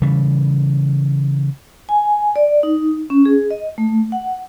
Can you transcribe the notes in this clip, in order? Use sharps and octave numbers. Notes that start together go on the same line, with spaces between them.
C#3 E3 G3
G#5
D5
D#4
C#4
G#4
D#5
A3
F#5